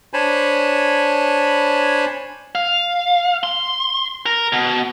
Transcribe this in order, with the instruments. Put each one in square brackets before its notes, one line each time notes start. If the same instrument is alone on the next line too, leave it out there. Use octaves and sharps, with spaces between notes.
[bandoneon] D4 C5 C#5 G#5 A5 B5
[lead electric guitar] F5
C6
A#4
B2